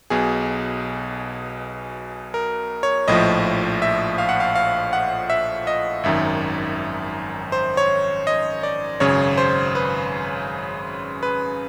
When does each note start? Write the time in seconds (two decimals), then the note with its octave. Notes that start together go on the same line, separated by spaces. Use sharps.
0.10 B1 B2 G#4
2.34 A#4
2.83 C#5
3.08 A#1 A2 F3 D#5
3.82 E5
4.18 F5
4.29 F#5
4.40 F5
4.55 F5
4.93 F#5
5.30 E5
5.67 D#5
6.03 G#1 F#2 D#3 E5
7.52 C5
7.77 C#5
8.27 D#5
8.63 D5
9.00 G#1 F#2 C#3 C#5
9.38 C5
9.75 B4
11.23 B4